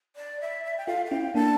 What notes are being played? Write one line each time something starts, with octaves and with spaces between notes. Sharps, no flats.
D5
E5
E5
G5
F4 A4 F5
F5
C#4 E4 G5
A#3 D4 A5